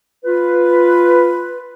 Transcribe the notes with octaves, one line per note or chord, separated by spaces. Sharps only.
F4 B4